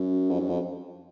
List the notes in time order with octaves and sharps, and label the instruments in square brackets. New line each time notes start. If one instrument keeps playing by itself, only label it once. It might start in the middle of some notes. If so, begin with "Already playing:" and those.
Already playing: [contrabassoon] F#2
F2
F#2
F2